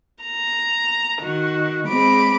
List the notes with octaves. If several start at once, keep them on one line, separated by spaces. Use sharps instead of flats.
A#5
D#3 F#4
G#3 C4 B5 D6